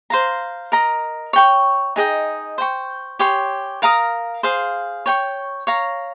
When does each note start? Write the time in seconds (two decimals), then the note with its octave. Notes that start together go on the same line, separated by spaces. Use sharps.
0.10 C5 F5 A#5
0.72 A#4 D#5 A#5
1.33 C#5 G5 C#6
1.96 D#4 G#4 D#5 G5
2.58 C5 G5 C#6
3.19 G4 C#5 G#5 C6
3.82 A#4 F5 A#5 D#6
4.43 G#4 C5 F5
5.06 C#5 G5 C#6
5.67 C#5 F5 A#5